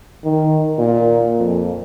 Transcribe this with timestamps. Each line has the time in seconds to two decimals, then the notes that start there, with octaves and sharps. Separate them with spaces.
0.24 D#3
0.78 A#2
1.38 F2